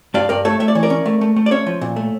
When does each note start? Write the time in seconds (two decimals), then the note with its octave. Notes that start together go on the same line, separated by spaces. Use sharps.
0.14 G2 D5 F5
0.29 G2 A#4 D5
0.45 A3 A4 C#5
0.60 A3 E5
0.68 D5
0.75 E3 C#5
0.83 A#4 D5
0.90 C#4
1.06 A3
1.21 A3
1.36 A3
1.46 D5
1.51 C#4 C#5 E5
1.67 F3
1.81 A#2
1.96 A3